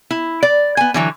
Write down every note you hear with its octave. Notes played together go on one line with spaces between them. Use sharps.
E4
D5
B3 G#5
D3 E3 F#3